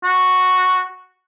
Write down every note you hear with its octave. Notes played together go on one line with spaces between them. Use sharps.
F#4